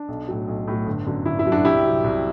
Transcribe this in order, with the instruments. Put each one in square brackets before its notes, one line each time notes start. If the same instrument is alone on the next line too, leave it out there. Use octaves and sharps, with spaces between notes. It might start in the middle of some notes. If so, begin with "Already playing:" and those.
Already playing: [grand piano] D4
B1
A2 F#3
B1
A2 F#3
G1
F#2 D3 F#3
G1 E4
E4
F#2 D3 F#3
D4 F#4
C2 E4 G4
C3 F#3
C2